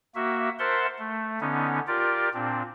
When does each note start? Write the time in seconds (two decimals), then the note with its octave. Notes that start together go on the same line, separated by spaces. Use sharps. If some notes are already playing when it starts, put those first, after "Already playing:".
0.15 A#3 F#4 E5
0.59 A#4 C5 E5 F#5 A5 C6
0.99 A3
1.41 D3 B3 C#4 D#4
1.87 F4 G4 A#4 D5
2.34 A#2 C4 D4